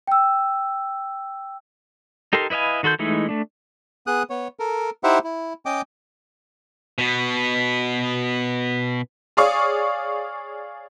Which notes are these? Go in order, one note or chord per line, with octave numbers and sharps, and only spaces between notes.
G5 E6
D#4 G4 A4 A#4 C6
E4 B4 D#5 F5 G#5
D#3 F#4 A4 C6 G6
E3 G#3 A3 D#4 E4
A3 D4
B3 G#4 D#6 F#6
B3 C#5
A4 A#4
D#4 E4 G4 C5 E5 F#5
E4
C#4 D#5 G5 D6
B2 B3
G#4 C#5 D5 F5 C#6 D#6